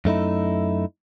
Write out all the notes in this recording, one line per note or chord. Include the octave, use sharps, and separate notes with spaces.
F#2 A3 D#4 E4